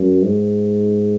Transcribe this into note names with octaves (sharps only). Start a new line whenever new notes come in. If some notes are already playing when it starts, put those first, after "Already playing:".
Already playing: F#2
G#2